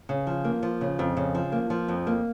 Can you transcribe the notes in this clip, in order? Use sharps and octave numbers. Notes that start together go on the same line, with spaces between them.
C#3
F3
A#3
F3
C#3
F2
C#3
F3
A#3
F3
F2
A#3